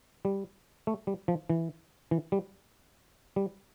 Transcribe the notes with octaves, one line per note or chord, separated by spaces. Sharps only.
G3
A3
G3
F3
E3
E3
G3
G3